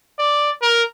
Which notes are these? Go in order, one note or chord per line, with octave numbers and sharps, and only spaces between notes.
D5
A#4